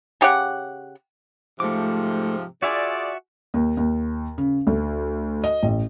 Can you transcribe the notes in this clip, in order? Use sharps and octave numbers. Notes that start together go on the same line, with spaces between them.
C#3 G4 C#5 F#5
G#2 C3 F3 A3 D6
F4 F#4 G#4 D5 E5 G#5
D#2
D#2
C#3
D2
D#5
A1